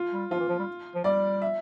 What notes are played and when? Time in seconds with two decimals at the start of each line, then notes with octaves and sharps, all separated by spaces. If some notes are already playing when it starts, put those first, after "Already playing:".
Already playing: F4
0.13 G3
0.31 F3 F4
0.40 E3
0.49 F3
0.59 G3
0.95 F3
1.04 G3 D5
1.42 E5